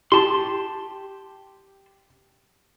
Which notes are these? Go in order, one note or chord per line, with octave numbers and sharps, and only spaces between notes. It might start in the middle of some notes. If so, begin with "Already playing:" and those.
G4 A5 C6